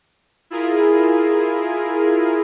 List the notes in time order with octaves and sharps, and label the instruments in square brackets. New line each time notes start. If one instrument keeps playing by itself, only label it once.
[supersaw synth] E4 F4 G#4 A#4